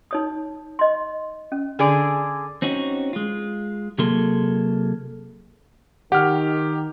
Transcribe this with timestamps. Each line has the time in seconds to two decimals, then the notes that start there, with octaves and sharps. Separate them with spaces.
0.11 D#4 C#5 D#6
0.79 D#5 C6
1.52 C#4
1.79 D3 G#4 D5
2.62 C4 C#4 D#4 F#4
3.13 G#3 F4
3.98 C3 F#3 A#3 G#4 A4 C6
6.12 D#3 G4 F#5 F6